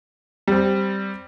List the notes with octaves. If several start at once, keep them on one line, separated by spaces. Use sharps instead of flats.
G3 C4